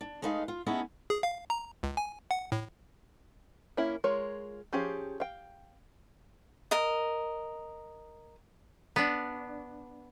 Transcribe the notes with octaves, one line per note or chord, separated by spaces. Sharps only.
D4
G#3 A3 D#4 B4 F5
F4
A3 B3 C#4 D#4 E4 G#4
G#4
F5
A#5
C#2
G#5
F#5
A2
A#3 C#4 E4
G#3 F4 A#4 C#5
F3 C#4 G4 G#4 F5
F5 G5
A#4 D#5
B3 D4